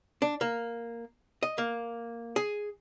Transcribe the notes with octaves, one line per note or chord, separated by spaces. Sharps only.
D4
A#3
D#5
A#3
G#4